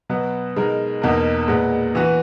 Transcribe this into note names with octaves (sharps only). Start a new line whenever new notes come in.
B2 F#3 B3
B2 G#3 D#4 A#4
E2 B2 A#3 D#4 A#4
A#2 G#3 B3
E3 B3 F#4 B4